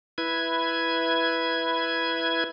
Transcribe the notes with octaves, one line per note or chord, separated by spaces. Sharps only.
E4 B4 G#6